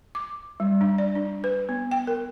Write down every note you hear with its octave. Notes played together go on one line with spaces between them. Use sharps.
D6
G3
D4
D5
D4
B4
B3
G5
A#4